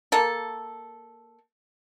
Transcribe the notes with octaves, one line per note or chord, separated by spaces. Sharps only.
A#3 A4